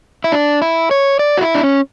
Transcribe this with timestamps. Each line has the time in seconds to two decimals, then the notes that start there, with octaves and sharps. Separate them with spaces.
0.24 E4
0.32 D4
0.62 E4
0.91 C#5
1.19 D5
1.37 F#4
1.41 E4
1.54 D4
1.63 C#4